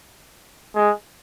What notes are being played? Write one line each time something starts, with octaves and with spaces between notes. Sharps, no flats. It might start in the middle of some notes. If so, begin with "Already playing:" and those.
G#3